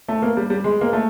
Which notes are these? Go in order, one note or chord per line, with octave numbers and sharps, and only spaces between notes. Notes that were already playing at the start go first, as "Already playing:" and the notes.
A3
A#3
G3
G3
G#3
A#3
A3